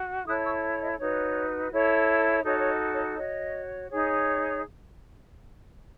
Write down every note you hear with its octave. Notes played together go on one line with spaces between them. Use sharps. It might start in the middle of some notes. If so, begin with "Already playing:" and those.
Already playing: F#4
E4 A4 C#5 D#6 F#6
C#6 E6
D#5
D#4 F#4 B4 C#5
E4 A4 C#5
D#4 F#4 A4 C#5 D#5
C#5
D#5
C#5
F#4 C#5 D#5
D#4 G#4 C#5